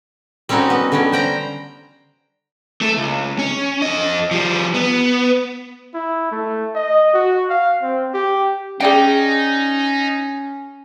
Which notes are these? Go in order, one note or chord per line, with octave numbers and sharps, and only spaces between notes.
G3 C4 C#4 D#4 F#4
B3
D3 G3 C#4
C5 G5 A#5
A3 A4
C#2
C#4
F2 D#5
F3 G3
B3
E4
A3
D#5
F#4
F5
C4
G4
C#4 D#4 G#4 D5 G5